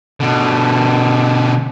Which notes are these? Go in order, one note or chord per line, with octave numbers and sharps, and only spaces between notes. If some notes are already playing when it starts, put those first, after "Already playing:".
B2 D3